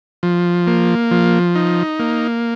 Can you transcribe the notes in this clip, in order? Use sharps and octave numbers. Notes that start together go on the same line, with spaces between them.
F3
A#3
F3
D#4
A#3